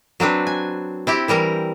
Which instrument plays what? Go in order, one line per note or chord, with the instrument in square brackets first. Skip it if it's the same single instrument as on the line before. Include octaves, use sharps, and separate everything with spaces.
[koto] F#3 C4 D4 B4
G#5
C4 E4 G4
E3 G3 A#4 A#5